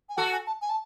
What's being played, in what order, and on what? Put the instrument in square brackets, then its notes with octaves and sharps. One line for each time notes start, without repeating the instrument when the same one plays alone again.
[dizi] G#5
[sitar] F#4 A4 [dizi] F#5
[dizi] G#5
A5
G#5
A5